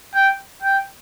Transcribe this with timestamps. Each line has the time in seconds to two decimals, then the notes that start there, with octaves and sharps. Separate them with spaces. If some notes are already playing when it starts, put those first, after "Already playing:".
0.14 G5
0.63 G5